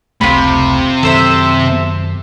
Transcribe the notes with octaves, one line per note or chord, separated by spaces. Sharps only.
F1 C#2 C3 A3 F4 B5
F#2 D#3 A4 C5 E5